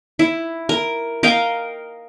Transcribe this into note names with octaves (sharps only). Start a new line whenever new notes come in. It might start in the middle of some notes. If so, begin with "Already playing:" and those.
E4
A#4
A#4 D#5 F5 G5